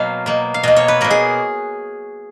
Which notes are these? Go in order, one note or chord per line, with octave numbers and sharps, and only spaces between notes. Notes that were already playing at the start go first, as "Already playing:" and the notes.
Already playing: B2 F#3 A#3 F5
B2 A#3
F5
B2 A#3 D#5
C#5
B4
B2 A#3 A#4
G#4